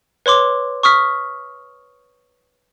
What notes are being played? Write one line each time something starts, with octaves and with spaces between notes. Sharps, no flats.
B4 C#5 C6 D6
C#6 D#6 F6 B6